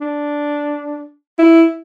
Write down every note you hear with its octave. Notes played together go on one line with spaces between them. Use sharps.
D4
E4